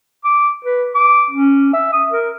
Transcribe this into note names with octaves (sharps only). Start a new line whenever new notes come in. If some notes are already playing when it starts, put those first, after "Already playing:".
D6
B4
D6
C#4
E5
D#6
A#4